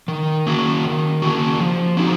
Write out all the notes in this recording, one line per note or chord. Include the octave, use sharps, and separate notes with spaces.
D#3
A#3 C#4 F#4
D#3
A#3 C#4 F#4
F3
C4 D#4 F#4